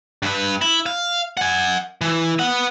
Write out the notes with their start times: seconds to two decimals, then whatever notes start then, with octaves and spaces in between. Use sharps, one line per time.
0.23 G2 B4
0.62 E4
0.86 F5
1.37 F#5 G#5
2.01 E3
2.39 B3 F#5